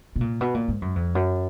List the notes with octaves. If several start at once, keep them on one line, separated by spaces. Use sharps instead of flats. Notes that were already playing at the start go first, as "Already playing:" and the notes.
B2
A#2
B2
A#2
G#2
F#2
F2
F#2